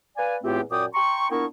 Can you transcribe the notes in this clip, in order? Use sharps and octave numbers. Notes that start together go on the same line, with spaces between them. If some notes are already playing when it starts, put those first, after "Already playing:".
B4 D5 F5 G#5
E2 A2 A3 C4 F4 G4
F#2 A#2 D5 G5 D6 D#6
G5 A#5 C6 C#6
A#2 B3 D4 E4 A#4 C#6